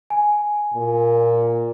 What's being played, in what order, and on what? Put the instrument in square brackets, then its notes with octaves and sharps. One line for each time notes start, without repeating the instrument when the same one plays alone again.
[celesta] G#5
[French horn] A#2